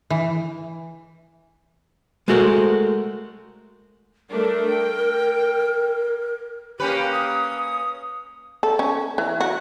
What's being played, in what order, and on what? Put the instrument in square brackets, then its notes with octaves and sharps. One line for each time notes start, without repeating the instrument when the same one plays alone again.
[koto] E3
[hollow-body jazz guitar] G#3 A3 F#4 A#4 C5
[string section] G3 A3 D4 [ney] A#4
[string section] G5
[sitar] A#3 C#4 B4 [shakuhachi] G4
[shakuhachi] D#6
[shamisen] A4
C#4
E3
F#4